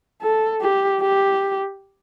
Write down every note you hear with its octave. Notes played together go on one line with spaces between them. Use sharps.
A4
G4
G4